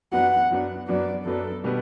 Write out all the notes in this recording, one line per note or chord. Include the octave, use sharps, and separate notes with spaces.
F#2 F#3 B3 D4 F#5
F#2 F#3 B3 D4
F#2 F#3 B3 D4 D5
F#2 F#3 B3 D4 A4
B2 G3 B3